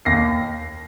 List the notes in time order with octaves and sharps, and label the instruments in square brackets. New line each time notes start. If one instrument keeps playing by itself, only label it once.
[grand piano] D#2 A#6 C7